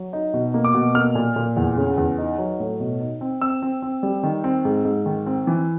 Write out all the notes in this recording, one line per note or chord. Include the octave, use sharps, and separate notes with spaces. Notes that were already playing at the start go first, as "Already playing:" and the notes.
Already playing: F#3
D#4
B2
A#3
D6
B2
A#3 F6
A#2
A#2
E2
C#3
E2
D#4
F#3
A2
B2
D#4
C4
C4 E6
C4
C4
G3
D#3
C4
G#2
G#2
D#3
C4
E3